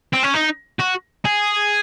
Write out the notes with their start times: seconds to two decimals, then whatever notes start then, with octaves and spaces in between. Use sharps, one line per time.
0.14 C4
0.24 C#4
0.35 D#4
0.80 F#4
1.25 G#4